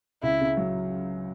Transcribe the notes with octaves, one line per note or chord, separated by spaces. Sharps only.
C#2 E4
C#3
F#3